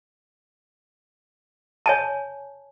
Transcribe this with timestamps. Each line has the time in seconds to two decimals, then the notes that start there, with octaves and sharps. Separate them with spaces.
1.86 C#5 G#5 A5